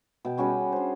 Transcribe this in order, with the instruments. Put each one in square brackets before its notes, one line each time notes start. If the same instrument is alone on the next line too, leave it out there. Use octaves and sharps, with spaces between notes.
[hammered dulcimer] B2 G5
G3 C#4 F#4 G#4
D4 C5